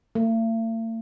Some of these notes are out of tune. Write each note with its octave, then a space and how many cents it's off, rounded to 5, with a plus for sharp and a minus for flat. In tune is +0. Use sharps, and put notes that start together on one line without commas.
A3 +45